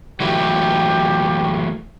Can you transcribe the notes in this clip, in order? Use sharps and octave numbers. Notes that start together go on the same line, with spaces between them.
E3 F#3 A3 G4